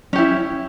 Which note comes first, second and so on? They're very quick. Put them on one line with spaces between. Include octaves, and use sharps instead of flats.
C#4 G4 E4